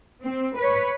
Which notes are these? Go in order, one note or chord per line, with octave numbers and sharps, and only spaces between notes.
C4
B4 C#5